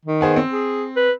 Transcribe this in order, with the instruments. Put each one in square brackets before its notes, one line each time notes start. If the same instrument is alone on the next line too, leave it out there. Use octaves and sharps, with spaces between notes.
[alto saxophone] D#3
[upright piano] B3 G#4 C5
C4
[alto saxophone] G#4
B4